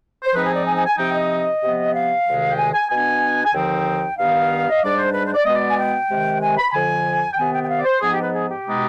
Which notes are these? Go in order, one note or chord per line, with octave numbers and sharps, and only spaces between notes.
C5
G#2 F3 C4 D#4 B4
G#4
D5
G#5
G#5
G#5
C3 F3 C4 D#4 G5
D#5
C3 F3 B3
F5
D2 C3 D#3 G#3
G5
G#5
G#5
B2 B3 D4 G#5
G#5
D#2 D3 F3 C4 D#4 G5
G2 D#3 B3 D#4 F5
D#5
G#2 G3 D4 D5
C5
B4
C5
D5
B2 G#3 B3 D#5
D5
G#5
G5
C3 D#3 G#3
G#5
B5
B5
F2 D3 F3 G#5
G5
C3 D#3 B3 G#5
G5
G5
F5
D5
C5
G#2 F3 B3 D#4 G#4
G4
B4
G#4
G4
B2 G#3 B3 D#4